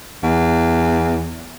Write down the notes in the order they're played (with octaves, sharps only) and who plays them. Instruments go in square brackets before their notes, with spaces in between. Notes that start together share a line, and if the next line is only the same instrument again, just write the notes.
[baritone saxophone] E2